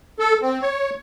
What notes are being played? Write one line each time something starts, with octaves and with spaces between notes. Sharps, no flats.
A4
C4
C#5